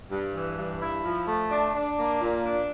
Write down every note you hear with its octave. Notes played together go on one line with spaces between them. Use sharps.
G2
E3
G2
E4
F3
A3
D4
D4
A#3
A#2
D4